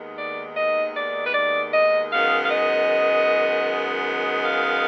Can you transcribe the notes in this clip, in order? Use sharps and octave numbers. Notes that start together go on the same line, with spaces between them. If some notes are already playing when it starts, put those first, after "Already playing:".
Already playing: D#2 D#3 G#3 B3
D5
D#5
D5
B4
D5
D#5
F#2 D#3 G#3 B3 F5
F5
D#5
F5